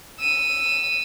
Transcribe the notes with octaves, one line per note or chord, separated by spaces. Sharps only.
E6 D#7